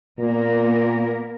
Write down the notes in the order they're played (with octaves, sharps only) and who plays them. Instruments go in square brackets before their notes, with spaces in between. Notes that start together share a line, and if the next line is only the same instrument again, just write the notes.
[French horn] A#2 [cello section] A#3 B3 A#4